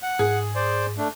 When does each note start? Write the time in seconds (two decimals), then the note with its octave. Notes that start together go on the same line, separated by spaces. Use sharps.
0.03 F#5
0.19 G#2 G#4
0.55 C5 D5
0.98 A3 D4